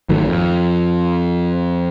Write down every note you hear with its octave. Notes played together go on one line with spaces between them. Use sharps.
G#1 D#3 F#3 A3
F2